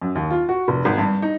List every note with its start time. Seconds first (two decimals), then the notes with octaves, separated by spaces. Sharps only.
0.02 F#2
0.15 D#2
0.31 F4
0.49 F#4
0.68 F1
0.85 G#1
0.98 G2
1.22 D#4